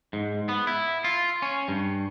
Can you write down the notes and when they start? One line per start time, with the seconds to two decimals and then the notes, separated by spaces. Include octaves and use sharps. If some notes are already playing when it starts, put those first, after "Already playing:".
0.13 G#2
0.49 B3
0.67 E4
1.04 F4
1.42 C#4
1.68 G2